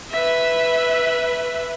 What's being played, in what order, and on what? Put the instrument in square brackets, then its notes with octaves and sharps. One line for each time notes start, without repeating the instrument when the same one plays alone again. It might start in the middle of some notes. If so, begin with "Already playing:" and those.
[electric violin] B4 E5